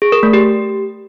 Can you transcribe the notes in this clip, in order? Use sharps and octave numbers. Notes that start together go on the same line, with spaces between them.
G#4
A#4
A3
G4